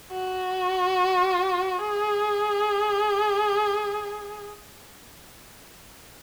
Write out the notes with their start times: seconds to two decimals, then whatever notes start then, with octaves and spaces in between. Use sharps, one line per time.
0.12 F#4
1.79 G#4